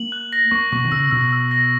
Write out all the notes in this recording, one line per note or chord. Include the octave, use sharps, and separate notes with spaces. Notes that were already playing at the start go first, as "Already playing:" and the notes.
Already playing: A#3 F#7
F#6
A#6
A#3 C#6
B2 C#6
D#3
C#3 E6
B2 E6
E6
A#6